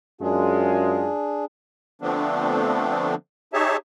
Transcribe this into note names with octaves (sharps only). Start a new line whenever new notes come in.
F#2 G#3 D4 F4 G#4
D3 F3 A3 B3 C4 D4
D#4 G4 G#4 C#5 E5 A5